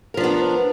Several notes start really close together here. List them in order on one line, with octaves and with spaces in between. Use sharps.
A#4 F3 D4 B3